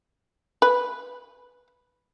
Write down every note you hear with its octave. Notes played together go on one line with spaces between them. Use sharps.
B4